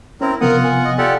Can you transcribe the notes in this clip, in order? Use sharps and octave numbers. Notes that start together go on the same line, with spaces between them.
C4 C#4 E4 A#4
C3 F3 B3 F4 A#4 F#5 D#6
G#5
D#5
F4 G4 A4 D5 F#5